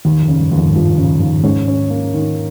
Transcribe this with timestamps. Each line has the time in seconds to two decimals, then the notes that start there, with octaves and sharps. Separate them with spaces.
0.05 D#2 D#3
0.22 F2
0.28 C#3
0.40 G2
0.52 D#2
0.58 F2
0.68 G#2
0.74 G2 F3
0.98 C#3
1.20 D#2
1.44 G#2 C#4
1.67 C#4
1.90 A#3
2.14 D#3